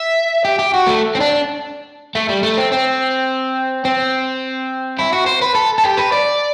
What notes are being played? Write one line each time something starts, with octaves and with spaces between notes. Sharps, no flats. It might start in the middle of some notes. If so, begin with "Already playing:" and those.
Already playing: E5
G4
G4
F#4
A3
C4
D4
A3
G3
A3
C4
C4
C4
E4
F#4
C5
B4
A4
A4
G4
B4
D5